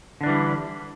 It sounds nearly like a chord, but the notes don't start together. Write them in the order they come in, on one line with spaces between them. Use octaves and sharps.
D3 D4 E3 G3